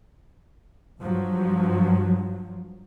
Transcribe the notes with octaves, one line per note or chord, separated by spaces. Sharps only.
G2 F3 F#3